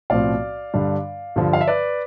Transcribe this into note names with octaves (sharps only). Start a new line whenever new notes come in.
B1 A2 F3 C4 D5 F5
G2 D3 G3 D4
G2 D3 F3
F5
E5
B4 D5